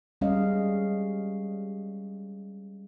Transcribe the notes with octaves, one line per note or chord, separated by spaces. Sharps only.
G3 G#3 C#4 D#5 F5